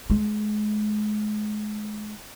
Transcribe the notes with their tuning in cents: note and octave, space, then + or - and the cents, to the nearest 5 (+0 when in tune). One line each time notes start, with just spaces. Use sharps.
G#3 +30